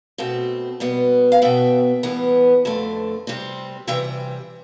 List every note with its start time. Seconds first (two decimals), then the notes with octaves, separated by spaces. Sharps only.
0.18 B2 A3 C4
0.80 B2 G3 B3
1.32 F5
1.42 B2 B3 E5 G5
2.03 A2 E3 G3 B3
2.65 F2 D3 A3
3.27 C3 G3 C4
3.87 C3 E3 G3 E5 G5